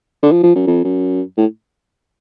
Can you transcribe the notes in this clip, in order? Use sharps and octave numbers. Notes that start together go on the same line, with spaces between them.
D3
F3
F3
F#2
F2
F#2
A2